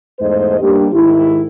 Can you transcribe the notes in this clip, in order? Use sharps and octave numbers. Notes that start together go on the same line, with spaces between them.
E2 G#2 A3 C5 D#5
G3 A#3 D4 G4
G#2 D#3 E4